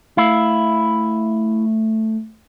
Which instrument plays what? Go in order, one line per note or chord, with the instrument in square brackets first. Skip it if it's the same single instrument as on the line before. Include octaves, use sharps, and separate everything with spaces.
[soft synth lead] A3 [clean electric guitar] E4 F5